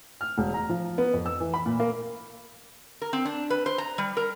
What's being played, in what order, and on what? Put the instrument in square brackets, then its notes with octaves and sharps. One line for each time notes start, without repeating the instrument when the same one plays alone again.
[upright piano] F6
E1
A#5
F3
B3
F2
E6
E3
B5
A#2
A#3
[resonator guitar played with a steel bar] A#4
C4
D4
B4
C5
A#5
G3
A#4